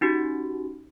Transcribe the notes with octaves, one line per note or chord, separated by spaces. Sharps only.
C#4 D#4 F#4 G4